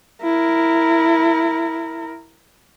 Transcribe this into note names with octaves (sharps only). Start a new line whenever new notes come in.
E4 A#4